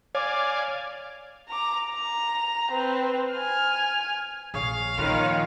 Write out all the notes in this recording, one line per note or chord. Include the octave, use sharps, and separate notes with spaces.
C#5 D5 F5 G#5 D6
A#5 D6
A#5
C4 B4
G#5 F6
A#1 G#4 C#5 F5
A#2 D#3 F3 F4 B4 C#5